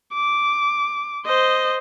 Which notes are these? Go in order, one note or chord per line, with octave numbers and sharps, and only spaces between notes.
D6
C5 D#5